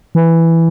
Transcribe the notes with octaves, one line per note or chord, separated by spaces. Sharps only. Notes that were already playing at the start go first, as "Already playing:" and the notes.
E3